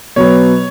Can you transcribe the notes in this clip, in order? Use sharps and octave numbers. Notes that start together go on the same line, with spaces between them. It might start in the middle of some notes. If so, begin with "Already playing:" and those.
B2 F#3 B3 C#5